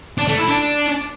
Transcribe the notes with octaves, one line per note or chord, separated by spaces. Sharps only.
D4
A3
E4
D4